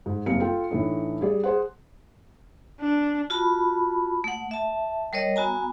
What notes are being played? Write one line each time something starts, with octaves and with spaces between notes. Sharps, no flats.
G#2
F#1 C3 G3 A#3 F5 C#7
F4 A4 F5 G5
A2 E3 A3 D4 D#4
G3 G#4 D5
G#4 C5 F#5
D4
F4 F#4 A5 B5
A3 F#5
E5 A5
G3 A#4 C#5 D#5
B3 F#4 G#5 A#5